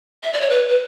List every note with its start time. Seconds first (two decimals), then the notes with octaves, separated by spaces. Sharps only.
0.23 E5
0.33 D5
0.41 C#5
0.50 B4
0.69 B4